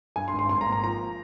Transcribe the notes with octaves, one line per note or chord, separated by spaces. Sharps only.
G2 G#5
C6
G#1
C6
G#1 C6
A#5
A#3
A#5
F3 A#5